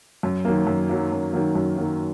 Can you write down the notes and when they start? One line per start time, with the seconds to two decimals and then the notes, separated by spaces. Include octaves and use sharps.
0.23 F#2
0.45 D#3 F#3 A#3
0.67 F#2
0.89 D#3 F#3 A#3
1.12 F#2
1.33 D#3 F#3 A#3
1.55 F#2
1.78 D#3 F#3 A#3